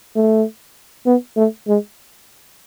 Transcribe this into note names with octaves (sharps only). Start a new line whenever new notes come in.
A3
B3
A3
G#3